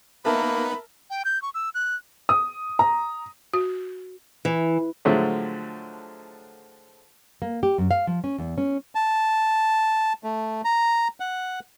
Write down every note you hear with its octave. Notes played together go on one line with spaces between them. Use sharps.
A#3 B3 D#4 A#4 B4 E5 A5 B5
G5
G6
C#6
E6
F#6
D#6
A#5
F#4
E3
A2 D3 F3 F#3 G#3 A3
A#3
G4
F#2
F5
F3
C#4
E2
C#4
A5
A3
A#5
F#5